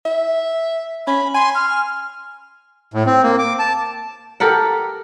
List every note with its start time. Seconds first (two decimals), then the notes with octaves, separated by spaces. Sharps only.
0.05 E5
1.07 C#4 B5
1.34 G#5 C6
1.55 F6
2.94 A2
3.06 C4
3.23 A#3
3.39 D6
3.59 A5
4.40 G4 A4 A#4 F#5